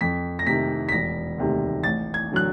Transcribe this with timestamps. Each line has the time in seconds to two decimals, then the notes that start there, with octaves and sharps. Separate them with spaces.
0.01 F2 B6
0.39 A#6
0.47 C3 D#3 B6
0.89 B6
0.92 E1 A#6
1.38 D2 C3 D#3
1.83 A1 A6
2.14 G#6
2.32 D3 F#3 F#6